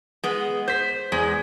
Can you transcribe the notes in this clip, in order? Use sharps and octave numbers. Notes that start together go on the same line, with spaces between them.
G#3 B3
C5 G6 B6
E2 G#3